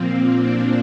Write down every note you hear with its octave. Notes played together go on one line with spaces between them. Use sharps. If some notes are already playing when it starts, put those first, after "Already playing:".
Already playing: A#2 F3 A#3 C4
A#3 D4